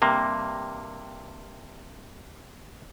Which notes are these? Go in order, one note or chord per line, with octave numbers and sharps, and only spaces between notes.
G2 C3 A#3